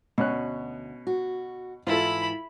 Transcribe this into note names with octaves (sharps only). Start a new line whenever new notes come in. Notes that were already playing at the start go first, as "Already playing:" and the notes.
D2 B2 C#4 F#6
F#4
G#2 E3 E4 F4 A4 B5